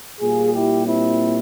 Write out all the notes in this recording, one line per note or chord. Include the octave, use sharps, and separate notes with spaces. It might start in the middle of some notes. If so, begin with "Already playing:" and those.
A#2 G3 F4 G#4
E4 G4
C4 E4